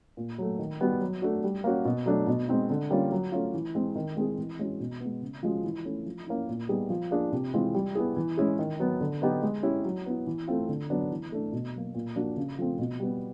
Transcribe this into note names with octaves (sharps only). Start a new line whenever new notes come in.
A#2
F#3 A3
D#3
G3 B3 D#4 F#4
F#3
A3 D4 F#4
G3
A#3 C#4 F#4
B2
F#3 A3 D4
B2
G#3 C4 D#4
D3
G3 A#3 C#4 F4
F#3
A3 C#4 F4
E3
G#3 C4
D#3
G#3 C4 E4 G#4
E3
G#3 C#4 F#4
B2
B3
G#3
C#3
F3 G#3 C#4 F#4
E3
A3 C#4 E4
F3
A#3 C#4 E4
A#2
G3 B3 D#4 G#4
F3
A#3 D4 F4 G#4
C3
E3 G#3 C4 F4
G3
B3 E4 G#4
E3
G#3 C#4 E4 G#4
D#3
F#3 B3
D3
F#3 B3 D#4 G4
G#3
C#4 E4 G4
F#3
B3 E4
E3
A3 C4 F4
D3
F#3 B3 D4
E3
A3 D4
B2
F#3 A#3
A#2
F3 A#3 D4 F#4
C#3
F3 A3 C4
B2
G3 B3